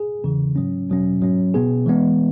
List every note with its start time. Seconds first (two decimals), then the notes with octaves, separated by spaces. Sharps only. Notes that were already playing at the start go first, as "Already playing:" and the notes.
Already playing: G#4
0.24 E2 C#3 E3
0.56 G#2 F#3 C#4
0.89 E2 B2 F#3 C#4
1.21 G#2 F#3 C#4
1.54 B2 B3 G#4
1.86 E3 G#3 B3